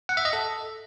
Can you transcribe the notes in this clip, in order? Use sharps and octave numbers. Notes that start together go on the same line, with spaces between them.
F#5
E5
D#5
A4